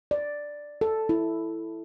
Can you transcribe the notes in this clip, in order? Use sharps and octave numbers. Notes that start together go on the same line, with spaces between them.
D5
A4
E4